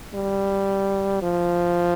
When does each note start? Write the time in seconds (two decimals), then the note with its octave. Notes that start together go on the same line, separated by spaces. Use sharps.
0.14 G3
1.22 F3